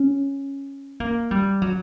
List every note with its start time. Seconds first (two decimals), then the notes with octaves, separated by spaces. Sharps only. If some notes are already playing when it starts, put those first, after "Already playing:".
Already playing: C#4
1.00 A#3
1.31 G3
1.62 F#3